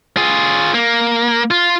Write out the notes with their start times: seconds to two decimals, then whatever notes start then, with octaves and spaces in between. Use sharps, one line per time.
0.17 F4 G#4
0.74 A#3
1.51 F4